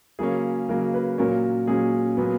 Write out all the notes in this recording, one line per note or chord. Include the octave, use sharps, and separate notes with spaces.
C#3 F#3 A#3 C#4 G#4
C#3 F#3 A#3 C#4 A#4
B4
A#2 F#3 C#4 A#4
A#2 F#3 C#4 G#4
A#2 F#3 B3